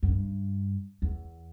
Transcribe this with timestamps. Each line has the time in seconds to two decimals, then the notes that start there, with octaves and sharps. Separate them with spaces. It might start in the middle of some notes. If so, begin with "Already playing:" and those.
0.03 F#2
0.09 G2
1.02 E2